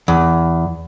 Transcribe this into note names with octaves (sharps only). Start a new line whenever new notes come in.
E2